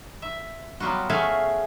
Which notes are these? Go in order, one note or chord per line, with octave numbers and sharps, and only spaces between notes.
E5
F#3 G3 B3 F4 F#4
A3 C#4 F#4 G#4 E5 F5